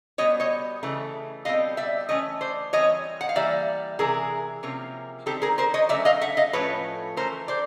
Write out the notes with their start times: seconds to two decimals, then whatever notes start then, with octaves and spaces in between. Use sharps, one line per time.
0.18 B2 G3 B3 C#5 D#5
0.40 C#5 D#5
0.83 C#3 E3 A3
1.45 B2 G3 C4 D#5 F5
1.77 D5 E5
2.09 E3 A3 C#4 C#5 D#5
2.41 C5 D5
2.73 E3 G3 C4 C#5 D#5
3.21 F#5
3.29 F5
3.35 E3 G3 A#3 D5 E5
3.99 C3 E3 G#3 G#4 A#4
4.63 C3 F3 A#3 C#4
5.26 D#3 G3 C4 G4 A4
5.42 G#4 A#4
5.58 A#4 C5
5.74 C#5 D#5
5.89 D3 F#3 A3 C#4 D5 E5
6.05 D#5 F5
6.21 E5 F#5
6.37 D#5 F5
6.53 A2 F3 A3 C#4 B4 C#5
7.17 E3 A3 C#4 A#4 C5
7.48 C5 D5